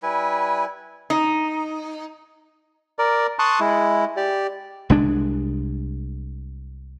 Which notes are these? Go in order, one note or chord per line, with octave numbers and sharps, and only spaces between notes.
G3 E4 B4 G#5
D#4
A#4 D5
A5 C6 C#6 D#6 F#6
G#3 E4
G4 D5
C2 G#3 D4